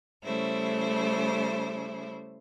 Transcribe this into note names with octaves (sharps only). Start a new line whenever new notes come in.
C#3 G3 A3 E4 C5